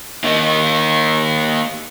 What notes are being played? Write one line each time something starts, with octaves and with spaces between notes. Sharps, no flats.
A#3 D#4